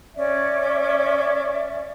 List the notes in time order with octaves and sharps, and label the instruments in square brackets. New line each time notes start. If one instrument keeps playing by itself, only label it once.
[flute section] C#4 D5 E5